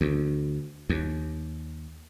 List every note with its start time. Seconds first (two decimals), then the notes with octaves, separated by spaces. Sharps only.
0.01 D2
0.89 D#2